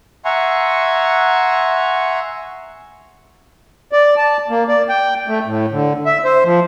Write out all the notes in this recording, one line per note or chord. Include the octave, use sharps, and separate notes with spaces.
E5 F#5 G#5 A#5 C6 C#6
D5
A5
A#3
D5
G5
A3
A2
D3
E5
C5
F3